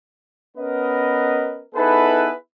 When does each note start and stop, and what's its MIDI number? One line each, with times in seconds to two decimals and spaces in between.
0.57 1.61 59
0.57 1.61 61
0.57 1.61 70
0.57 1.61 71
0.57 1.61 75
1.75 2.32 59
1.75 2.32 63
1.75 2.32 64
1.75 2.32 68
1.75 2.32 69
1.75 2.32 71